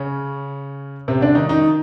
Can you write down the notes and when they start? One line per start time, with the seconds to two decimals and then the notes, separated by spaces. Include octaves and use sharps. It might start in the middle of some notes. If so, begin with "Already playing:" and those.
Already playing: C#3 C#4
1.08 C3 C4
1.21 D3 D4
1.35 D#3 D#4
1.49 D#3 D#4